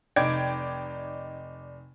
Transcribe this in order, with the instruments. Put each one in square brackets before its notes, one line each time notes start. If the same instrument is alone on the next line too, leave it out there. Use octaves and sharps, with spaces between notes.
[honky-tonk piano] F1 D#4 D5 G5 G#6 D7